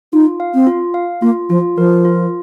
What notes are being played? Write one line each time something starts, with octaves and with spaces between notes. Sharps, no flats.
D#4 F4
F5
C4
F4
F5
A#3 F4
F3 F4
F3 A#4
F4